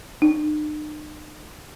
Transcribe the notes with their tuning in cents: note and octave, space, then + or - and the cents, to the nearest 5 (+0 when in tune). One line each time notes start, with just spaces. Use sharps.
D#4 -45